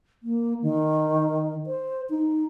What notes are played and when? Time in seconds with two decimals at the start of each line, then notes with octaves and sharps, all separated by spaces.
0.23 A#3
0.62 D#3
1.66 C5
2.10 D#4